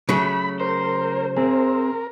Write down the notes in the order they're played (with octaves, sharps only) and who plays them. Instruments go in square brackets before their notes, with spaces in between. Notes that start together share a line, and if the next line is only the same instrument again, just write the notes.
[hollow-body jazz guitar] C#3 F#3 A3 [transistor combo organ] B5
[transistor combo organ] A#4 [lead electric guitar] C5
[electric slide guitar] C4 G#4 [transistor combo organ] A#4